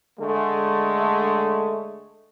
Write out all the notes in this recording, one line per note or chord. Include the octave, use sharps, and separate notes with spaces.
D3 G#3 A3